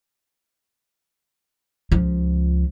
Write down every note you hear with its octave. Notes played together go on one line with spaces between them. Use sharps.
C#2 F3